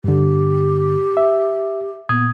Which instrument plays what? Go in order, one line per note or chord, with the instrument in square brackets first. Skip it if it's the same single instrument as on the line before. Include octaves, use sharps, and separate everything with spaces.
[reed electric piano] G2 D3 [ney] G4
[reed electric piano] E5
[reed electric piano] A#2 D#6 G#6 [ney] B3